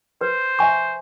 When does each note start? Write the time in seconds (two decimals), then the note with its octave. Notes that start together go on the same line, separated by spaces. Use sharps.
0.21 B4 C5
0.59 E5 G#5 C#6